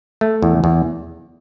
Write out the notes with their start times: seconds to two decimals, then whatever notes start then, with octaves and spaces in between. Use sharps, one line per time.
0.21 A3
0.42 E2
0.64 E2